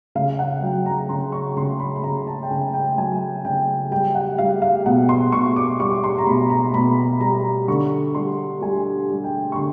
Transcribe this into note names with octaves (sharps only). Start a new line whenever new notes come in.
C#3 F5
F#5
F#3 G5
A#5
C#3 C6
C#6
C#3 C6
B5
B5
C#3 A#5
A5
G5
C#3 G#5
G5
F#3 G#5
C#3 G5
G3 G5
F#5
G3 F5
F5
B2 F#5
C6
B2 C#6
D6
G3 C#6
C6
A#5
B2 B5
A#5
B2 B5
G3 A#5
D3 C#6
G3 C6
G3 G#5
G3
G5
C#6
D3 C6